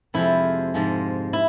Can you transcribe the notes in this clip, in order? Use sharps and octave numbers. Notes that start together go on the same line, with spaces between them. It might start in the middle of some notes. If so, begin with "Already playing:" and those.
F2 C3 F3 G#3 E4
G#2 F3 G#3
E4